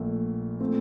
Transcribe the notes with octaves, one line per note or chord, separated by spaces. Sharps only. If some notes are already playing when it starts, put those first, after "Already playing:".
Already playing: A#1 A#2 A3
A#2 A3 C4